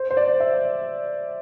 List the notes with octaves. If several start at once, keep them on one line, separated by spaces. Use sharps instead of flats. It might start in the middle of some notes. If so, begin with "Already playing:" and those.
Already playing: C5
C5
D5
E5